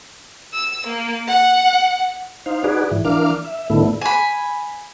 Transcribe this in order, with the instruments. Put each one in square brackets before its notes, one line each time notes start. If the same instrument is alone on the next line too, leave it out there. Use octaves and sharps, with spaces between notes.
[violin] E6
A#3
F#5
[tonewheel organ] D#4 C5 F5
D#4 F#4 G#4 B4 D5
G#2 E3
E3 D4 A#4 F5 D6 F6
E5
A2 D3 D#3 A3 B3 E4
[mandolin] G#5 B5